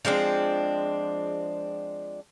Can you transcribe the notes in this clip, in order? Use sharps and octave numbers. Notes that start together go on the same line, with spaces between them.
F3 G#3 C4 D4